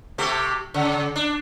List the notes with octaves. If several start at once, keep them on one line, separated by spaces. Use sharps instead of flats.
C3 A3 G4
C#3
D4